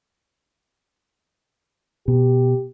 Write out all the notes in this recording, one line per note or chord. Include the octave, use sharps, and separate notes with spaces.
B2 G4